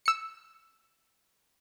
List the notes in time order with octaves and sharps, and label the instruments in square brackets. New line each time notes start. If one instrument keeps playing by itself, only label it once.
[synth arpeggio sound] E6 C#7